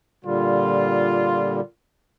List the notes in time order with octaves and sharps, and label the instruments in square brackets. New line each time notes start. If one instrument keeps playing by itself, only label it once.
[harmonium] A#2 D3 G3 [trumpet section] F4